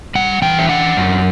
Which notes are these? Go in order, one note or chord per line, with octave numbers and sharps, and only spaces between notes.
G3 F#5
E3 G5
E5
D4 F#5
F#2